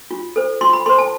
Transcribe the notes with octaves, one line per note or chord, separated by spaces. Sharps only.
F4
A4 C5
F4 C6
B5
A4 C5 C6
A5